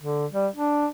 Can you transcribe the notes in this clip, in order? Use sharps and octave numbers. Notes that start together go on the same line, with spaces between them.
D3
G3
D4